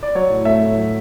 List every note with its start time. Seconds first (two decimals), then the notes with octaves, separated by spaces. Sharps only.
0.03 D5
0.15 F#3 C#5
0.30 A2
0.45 A3 E5
0.62 A2
0.77 F#3